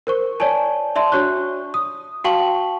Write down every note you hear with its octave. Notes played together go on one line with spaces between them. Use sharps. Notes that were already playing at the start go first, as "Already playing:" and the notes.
A#4 C5 C#6
C#5 D5 G#5 A5
D5 E5 A5 C6
D4 F#4 C#5 C#6 F#6
D#6
F#4 F5 G5 A5 C#6 F#7